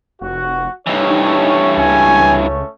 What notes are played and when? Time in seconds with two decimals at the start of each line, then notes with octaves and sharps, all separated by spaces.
0.21 F1 F#4
0.87 G2 E3 A3 C#4 D#4 C#5
1.77 C#2 G#5